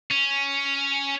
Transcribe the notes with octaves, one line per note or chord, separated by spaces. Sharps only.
C#4